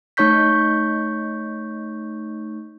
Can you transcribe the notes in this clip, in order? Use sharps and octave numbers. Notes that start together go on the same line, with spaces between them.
A3 D#4 C#5 C#6 G6 B6